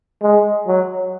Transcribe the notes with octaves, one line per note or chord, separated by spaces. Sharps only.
G#3
F#3